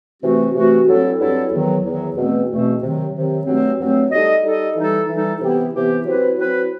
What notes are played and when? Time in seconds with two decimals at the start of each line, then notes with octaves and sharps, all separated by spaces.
0.22 C3 E3 A3 C4 F#4
0.54 C3 E3 A3 C4 F#4
0.87 G2 F#3 C4 E4 A4
1.19 G2 F#3 C4 E4 A4
1.53 E2 D#3 F#3
1.84 E2 D#3 F#3
2.16 E2 B2 A3 C4
2.49 E2 B2 A3 C4
2.82 C3 D#3 F#3
3.15 C3 D#3 F#3
3.46 G2 F#3 A3 C4
3.79 G2 F#3 A3 C4
4.11 G3 D#4 A4 D#5
4.44 G3 D#4 A4 D#5
4.75 E3 G3 D#4 A4
5.08 E3 G3 D#4 A4
5.41 C3 E3 B3 E4 G4
5.74 C3 E3 B3 E4 G4
6.06 F#3 C4 E4 B4
6.37 F#3 C4 E4 B4